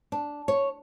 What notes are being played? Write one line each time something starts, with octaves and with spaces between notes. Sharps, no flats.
D4
C#5